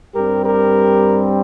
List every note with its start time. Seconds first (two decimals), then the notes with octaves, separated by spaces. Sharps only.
0.15 G2 G3 C4 G4 A#4
0.44 G4 A#4